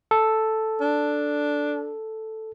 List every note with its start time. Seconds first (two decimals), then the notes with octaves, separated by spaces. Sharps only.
0.11 A4
0.80 D4